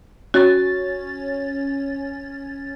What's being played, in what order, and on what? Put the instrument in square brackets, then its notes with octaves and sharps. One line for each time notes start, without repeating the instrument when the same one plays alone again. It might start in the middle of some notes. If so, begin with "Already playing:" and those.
[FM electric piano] C#4 C#5 A6 [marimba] F#4